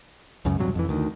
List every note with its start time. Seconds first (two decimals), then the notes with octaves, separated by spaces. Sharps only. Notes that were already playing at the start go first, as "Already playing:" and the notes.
0.45 C#2 F#2 C#3
0.58 E1 G2 C3 F#3
0.75 F2 E3
0.89 D2 D#3